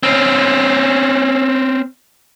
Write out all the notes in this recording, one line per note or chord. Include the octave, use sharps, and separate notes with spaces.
C4 C#4